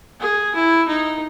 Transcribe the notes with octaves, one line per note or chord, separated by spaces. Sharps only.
G#4
E4
D#4